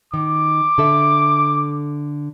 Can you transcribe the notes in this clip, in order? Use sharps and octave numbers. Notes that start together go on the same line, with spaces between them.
D#3 D6
D3 A4 E5